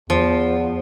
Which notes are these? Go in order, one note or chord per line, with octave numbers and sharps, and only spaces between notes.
E2 F3